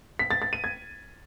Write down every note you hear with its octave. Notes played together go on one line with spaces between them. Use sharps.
B6
A6
A6
D#7
G#6